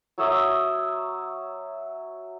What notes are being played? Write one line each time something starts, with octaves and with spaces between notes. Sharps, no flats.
F#3 C#5 E5 D#6